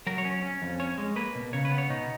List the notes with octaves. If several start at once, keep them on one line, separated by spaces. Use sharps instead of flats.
F#3 A#4
C#5
C#4
C#4
F2
C#4 C#5
G#3
A#3 B4
B2
C#3 C#5
B4
B3
C#5
B2 D#4